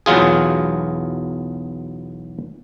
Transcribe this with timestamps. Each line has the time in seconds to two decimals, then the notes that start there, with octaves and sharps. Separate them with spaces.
0.06 B1 E2 F#3 F4 G#4